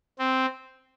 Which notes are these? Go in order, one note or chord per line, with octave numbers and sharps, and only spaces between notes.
C4